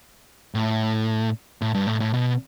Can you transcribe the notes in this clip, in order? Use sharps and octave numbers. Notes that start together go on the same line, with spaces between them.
A2
A2
G2
A2
A2
B2